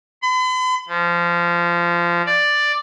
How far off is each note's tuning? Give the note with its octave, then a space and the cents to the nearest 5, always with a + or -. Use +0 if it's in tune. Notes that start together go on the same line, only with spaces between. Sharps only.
B5 +45
F3 -20
D5 +5